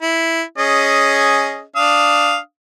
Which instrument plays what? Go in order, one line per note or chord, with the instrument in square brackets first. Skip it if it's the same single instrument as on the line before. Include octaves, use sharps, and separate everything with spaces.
[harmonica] E4
C#4 G#4 D#5
D4 F5 D#6